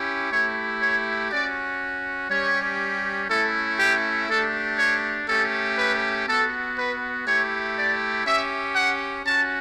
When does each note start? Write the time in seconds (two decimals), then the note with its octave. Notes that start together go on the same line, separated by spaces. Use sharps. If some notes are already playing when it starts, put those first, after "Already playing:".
Already playing: C#4 E4 G4
0.32 A3 E4 G4 C#5
0.82 C#5
1.31 C#4 F#4 D5
2.30 G3 C#4 G4 C#5
3.30 A3 C#4 E4 A4
3.80 G4
4.29 A3 D4 G4 A4
4.78 C#5
5.29 A3 C#4 G4 A4
5.78 B4
6.28 B3 F#4 A4
6.78 B4
7.27 A3 E4 G4 C#5
7.77 D5
8.26 C#4 G4 E5
8.76 F#5
9.25 C#4 F#4 A5